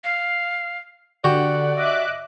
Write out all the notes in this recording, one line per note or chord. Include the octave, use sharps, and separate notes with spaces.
F5
D3 F#4 G4 D5 F#5
D#5 E5 D6 F#6